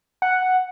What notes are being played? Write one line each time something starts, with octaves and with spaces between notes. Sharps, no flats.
F#5